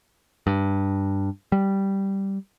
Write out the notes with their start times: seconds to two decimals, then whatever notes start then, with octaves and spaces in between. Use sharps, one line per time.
0.47 G2
1.52 G3